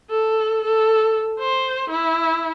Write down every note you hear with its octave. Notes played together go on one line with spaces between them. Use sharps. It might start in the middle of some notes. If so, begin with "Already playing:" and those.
A4
A4
C5
E4